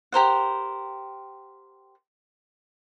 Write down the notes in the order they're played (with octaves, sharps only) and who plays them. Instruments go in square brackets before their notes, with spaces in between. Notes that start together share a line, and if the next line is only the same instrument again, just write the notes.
[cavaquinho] G4 A#4 C5 F#5